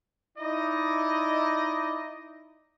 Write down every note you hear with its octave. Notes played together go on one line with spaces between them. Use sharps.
D#4 E4 D5 D#5